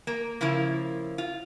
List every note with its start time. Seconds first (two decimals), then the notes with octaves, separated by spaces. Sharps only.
0.07 A#3
0.41 C#3 F3 A#3 E4
1.18 F4